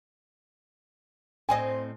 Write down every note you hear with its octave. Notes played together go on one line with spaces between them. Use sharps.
A2 C4 D#5 G#5